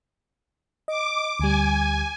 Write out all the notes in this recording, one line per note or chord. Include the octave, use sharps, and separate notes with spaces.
D#5 D6
D2 G3 G#5